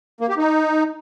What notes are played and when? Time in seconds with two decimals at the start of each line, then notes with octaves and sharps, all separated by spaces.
0.21 A#3
0.29 G4
0.38 D#4